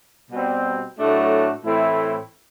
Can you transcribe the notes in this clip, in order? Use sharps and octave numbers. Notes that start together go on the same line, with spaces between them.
B2 G3 C4
A2 F#3 A3 D4 F#4
A2 E3 A3 C4 E4